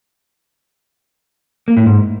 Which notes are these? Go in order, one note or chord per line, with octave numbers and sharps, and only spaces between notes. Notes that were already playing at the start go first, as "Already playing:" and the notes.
A#3
A2
G#2